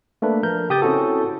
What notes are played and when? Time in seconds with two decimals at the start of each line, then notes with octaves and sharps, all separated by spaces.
0.22 A3 A#3 D4 B4
0.43 F3 A#4 G6
0.70 C#3 G4 D#6 G6 A6
0.82 C4 C#4 E4 F#4 A4